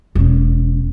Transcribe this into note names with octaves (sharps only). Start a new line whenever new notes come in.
E1 C#4